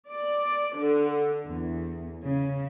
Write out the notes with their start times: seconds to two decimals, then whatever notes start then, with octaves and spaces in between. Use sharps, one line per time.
0.10 D5
0.77 D3
1.46 E2
2.22 C#3